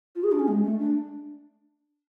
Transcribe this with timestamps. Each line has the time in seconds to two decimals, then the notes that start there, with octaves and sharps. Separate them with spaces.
0.16 F4
0.24 G#4
0.32 D4
0.39 C#4
0.48 G#3
0.63 A3
0.79 D4